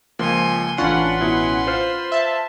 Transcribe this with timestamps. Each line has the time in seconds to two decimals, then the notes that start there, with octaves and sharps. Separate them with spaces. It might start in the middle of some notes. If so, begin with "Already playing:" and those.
0.19 C#2 F3 A#3 G#5 C6
0.78 A1 C#4 D4 F4 B4 F#5 C6 C#6
1.21 B2 E4
1.67 F4 C5 F6
2.12 E5 A5